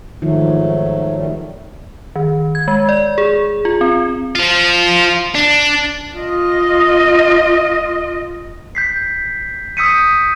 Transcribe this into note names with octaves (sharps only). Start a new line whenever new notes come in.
G#2 D#3 F3 F#3 A3
D#3 G3 A3
D#3
G#6
G#3
D5
G#4
F4
C4
F3 F4
D4
F4 D#5
G6 B6 C7
D#6 E6 G6 B6 C#7 D#7